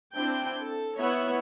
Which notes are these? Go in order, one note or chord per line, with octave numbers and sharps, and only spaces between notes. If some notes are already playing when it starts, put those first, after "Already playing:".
C4 D4 E4 G5
A4
B3 E4 C#5 E5 F#5